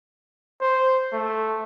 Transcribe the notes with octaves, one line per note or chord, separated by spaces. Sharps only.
C5
A3